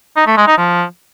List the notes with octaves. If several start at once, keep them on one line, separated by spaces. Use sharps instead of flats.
D#4
A3
G#3
D#4
F3